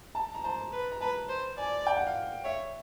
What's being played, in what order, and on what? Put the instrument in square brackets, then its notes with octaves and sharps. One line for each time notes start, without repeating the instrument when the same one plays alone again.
[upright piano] A5
A#5
[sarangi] C5 [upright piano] A5
[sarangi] B4
[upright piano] A#5
[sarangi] B4 [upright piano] A5
[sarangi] C5
[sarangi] D5 [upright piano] G#5
[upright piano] G5
F#5
F5
[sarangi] C#5 [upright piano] E5